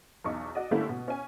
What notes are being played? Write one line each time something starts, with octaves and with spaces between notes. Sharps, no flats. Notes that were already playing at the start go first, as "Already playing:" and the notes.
B1 E2 D#4 C#6
F#4 D5 D#5
D3 G3 A3 A#3 C#4 E4
B2
C#4 G#5